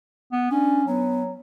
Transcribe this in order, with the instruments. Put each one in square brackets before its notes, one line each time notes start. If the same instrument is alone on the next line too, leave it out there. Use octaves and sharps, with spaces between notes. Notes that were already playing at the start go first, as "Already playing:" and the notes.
[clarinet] B3
[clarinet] C#4 [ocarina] D4
[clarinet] F#3 [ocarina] B3